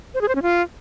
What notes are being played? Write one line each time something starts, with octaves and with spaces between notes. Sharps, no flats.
C5
G#4
C5
C#4
F4